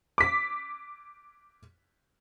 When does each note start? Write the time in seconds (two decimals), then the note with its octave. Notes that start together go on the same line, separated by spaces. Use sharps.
0.18 D6 B6